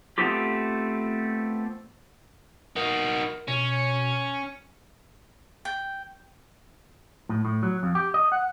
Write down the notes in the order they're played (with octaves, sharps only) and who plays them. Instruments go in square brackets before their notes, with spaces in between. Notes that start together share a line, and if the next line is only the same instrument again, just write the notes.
[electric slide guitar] A3 B3 C4 F4 G4
[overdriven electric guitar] D#4 F#4 [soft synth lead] A#4
[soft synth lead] B2 [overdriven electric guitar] C#4
[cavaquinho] G5
[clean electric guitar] A2
A2
F#3
F2
G4
D#5
F#5